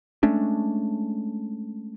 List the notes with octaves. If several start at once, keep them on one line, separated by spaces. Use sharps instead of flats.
G#3 A3 C#4 D4